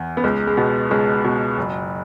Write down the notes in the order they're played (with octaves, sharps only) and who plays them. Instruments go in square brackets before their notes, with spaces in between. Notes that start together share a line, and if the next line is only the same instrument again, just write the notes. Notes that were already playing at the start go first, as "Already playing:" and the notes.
Already playing: [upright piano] E2
B3
C#2 G#3
G#3
B2 B3
C#2 G#3
B2
F#1